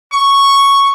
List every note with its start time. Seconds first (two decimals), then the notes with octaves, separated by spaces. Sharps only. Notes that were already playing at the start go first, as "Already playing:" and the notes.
0.12 C#6